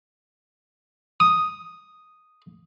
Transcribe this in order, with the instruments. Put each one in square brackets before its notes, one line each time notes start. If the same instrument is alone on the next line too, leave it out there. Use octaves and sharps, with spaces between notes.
[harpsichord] D#6